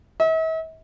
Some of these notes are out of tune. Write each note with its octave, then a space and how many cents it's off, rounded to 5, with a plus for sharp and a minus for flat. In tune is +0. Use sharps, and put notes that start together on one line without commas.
E5 -45